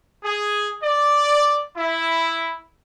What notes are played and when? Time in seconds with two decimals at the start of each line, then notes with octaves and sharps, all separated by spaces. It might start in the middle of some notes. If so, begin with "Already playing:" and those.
0.24 G#4
0.82 D5
1.76 E4